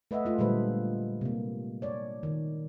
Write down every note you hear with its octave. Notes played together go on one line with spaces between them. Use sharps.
A3 B4 D#5 E5 F#5
A3 F4
A#2 D3 G3 G#3 B4 C5
C3 A#3
C#5 D5
D#3